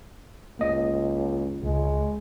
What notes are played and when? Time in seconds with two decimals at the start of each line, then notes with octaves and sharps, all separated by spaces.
0.59 C#2 A#3 D#5
1.63 C#2 G#3